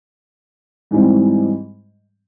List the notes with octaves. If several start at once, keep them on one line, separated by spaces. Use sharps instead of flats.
G#2 E3 G3 C4